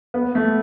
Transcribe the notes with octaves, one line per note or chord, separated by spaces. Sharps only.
B3
A3